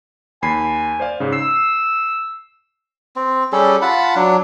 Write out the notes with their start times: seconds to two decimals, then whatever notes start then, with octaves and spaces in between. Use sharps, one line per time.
0.42 D#2 G#5 B5 C7
1.00 C5 D5 F5
1.20 G#2 C#3
1.33 E6 C7
3.16 C4
3.52 G3 C#4 G#4 A4
3.82 F4 F#5 A5 B5
4.16 F#3 D4